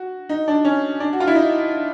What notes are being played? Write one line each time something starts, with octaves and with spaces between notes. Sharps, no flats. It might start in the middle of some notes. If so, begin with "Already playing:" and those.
Already playing: F#4
D#4
D4
C#4
D4
F#4
F4
E4
D#4